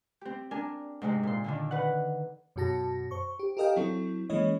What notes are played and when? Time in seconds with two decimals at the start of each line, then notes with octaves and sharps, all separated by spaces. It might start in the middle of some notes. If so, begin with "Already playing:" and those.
0.21 C4 G4
0.51 D4 A#4 G#5
1.02 G#2 C3 G#3
1.23 A#2 C6
1.44 D3 D#3 D4
1.71 B4 F#5
2.56 F#2 B2 F#4 A5 A#6
3.11 C5 C#6
3.39 G4
3.57 G4 A4 A#4 D#5 F5 G5
3.76 F#3 C4 E4 A4
4.30 E3 G#3 A#3 C#4 C#5 D#5